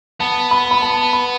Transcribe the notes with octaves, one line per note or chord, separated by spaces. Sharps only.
B3 A5
B5
B5
A5
B5